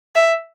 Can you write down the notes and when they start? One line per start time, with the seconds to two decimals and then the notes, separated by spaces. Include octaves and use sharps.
0.16 E5